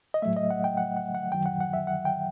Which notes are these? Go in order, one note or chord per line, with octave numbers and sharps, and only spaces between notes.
D#5
A2 F#3 A3 E5
D#5
F#5
G5
F#5
F#5
F#5
F#2 D#3 F#3 G5
F#5
F#5
E5
F#5
G5